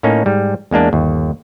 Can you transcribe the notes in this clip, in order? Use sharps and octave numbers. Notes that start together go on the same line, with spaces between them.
A2 A#3 C#4 D#4
G#2 G3
E2 G#3 A#3 D4
G1 D#2